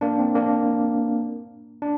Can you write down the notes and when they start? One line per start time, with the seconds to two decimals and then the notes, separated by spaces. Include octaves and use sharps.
0.01 A#3 D4
0.19 C4
0.35 A#3 D4
1.82 D4